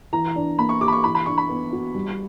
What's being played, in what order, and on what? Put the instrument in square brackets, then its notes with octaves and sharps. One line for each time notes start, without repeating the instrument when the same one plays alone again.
[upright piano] E3 [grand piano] A#5
[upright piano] D4
[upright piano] A#3 [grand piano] B5
[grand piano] C#6
[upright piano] G4 [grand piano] D6
[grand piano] B5
C#6
[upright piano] E3 [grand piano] B5
[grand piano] B5
[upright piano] D4 [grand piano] C#6
[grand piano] B5
[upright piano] B3
F#4
G3